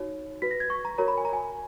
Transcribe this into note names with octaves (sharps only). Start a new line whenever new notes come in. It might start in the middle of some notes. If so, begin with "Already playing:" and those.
Already playing: D#4 F#4 C#5
F#4 B4 B6
A#6
G#6
C#6
A#5
F#4 A#4 C#5 A#5
B5
G#5
A#5
G#5